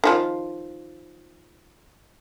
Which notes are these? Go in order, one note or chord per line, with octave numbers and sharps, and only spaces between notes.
D#3 F3 F4